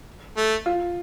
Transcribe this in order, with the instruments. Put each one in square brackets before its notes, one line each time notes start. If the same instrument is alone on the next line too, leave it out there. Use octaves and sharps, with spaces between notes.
[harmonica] A3
[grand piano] F4